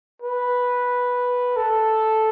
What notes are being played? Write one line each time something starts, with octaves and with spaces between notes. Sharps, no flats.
B4
A4